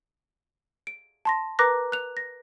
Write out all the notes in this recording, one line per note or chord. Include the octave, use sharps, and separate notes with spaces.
D7
A5 C6 A#6
A#4 B4 A#5 D6 F#6 A#6
F#6 F7
A#6